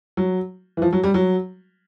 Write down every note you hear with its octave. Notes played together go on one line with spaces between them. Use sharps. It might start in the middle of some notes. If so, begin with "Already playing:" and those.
F#3
E3
F3
F#3
G3
F#3